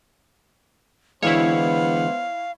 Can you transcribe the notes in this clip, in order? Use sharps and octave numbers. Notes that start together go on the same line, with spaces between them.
D3 E3 G#3 B3 E4 C5 C#5 F5